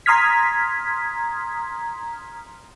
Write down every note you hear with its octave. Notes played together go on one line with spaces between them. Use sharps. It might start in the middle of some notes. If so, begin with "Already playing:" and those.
A#5 C6 D#6 F6 G#6 B6